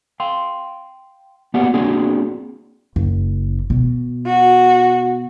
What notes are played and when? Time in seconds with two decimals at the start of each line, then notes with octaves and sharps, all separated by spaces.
0.20 F5 G5 C6
1.54 A#3 B3 F#4 G4 D5 F#5
1.74 A#3 C4 D4 F#4 G#4
2.96 F#1
3.70 B2
4.26 F#4